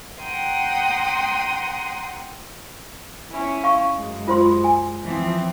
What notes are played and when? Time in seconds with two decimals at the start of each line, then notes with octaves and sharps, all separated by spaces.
0.22 F#5 G5 A#5 C6 D#6
3.31 C#4 E4
3.64 F5 C#6
3.97 F#2 G#3
4.28 F4 C5 C6
4.64 G#5
5.04 E3 F3 C4